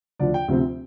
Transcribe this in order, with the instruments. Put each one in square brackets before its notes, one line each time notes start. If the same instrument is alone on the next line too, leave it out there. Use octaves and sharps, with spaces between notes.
[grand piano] D2 D3 F3 D4 D5
G5
D2 C3 F3 C4